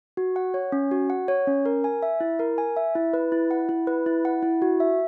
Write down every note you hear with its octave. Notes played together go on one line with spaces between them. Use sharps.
F#4
F#5
C#5
C#4
F#4
F#5
C#5
C#4
A#4
G#5
E5
E4
A#4
G#5
E5
E4
B4
E4
F#5
E4
B4
E4
F#5
E4
F#4
E5